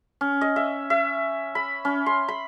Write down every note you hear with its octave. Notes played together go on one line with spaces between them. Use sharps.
C#4
D#5
E5
E5
B5
C#4
C6
B5